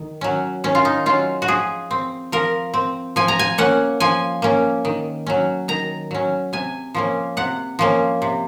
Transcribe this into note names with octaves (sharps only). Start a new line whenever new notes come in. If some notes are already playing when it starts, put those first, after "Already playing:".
Already playing: D#3
F#3 C#4
D#3 C#4
F4
D#4
F#3 C#4 F4
F#4
F3 G#4
C4
F3 A#4
C4
F3 G#5
A#5
G#5
A#3 C#4 F#5
F3 G#5
A#3 C#4
D#3
F#3 C#4
D#3 A#5
F#3 C#4
C3 G#5
F3 A#3 C#4
C3 F#5
F3 A#3 C#4
C3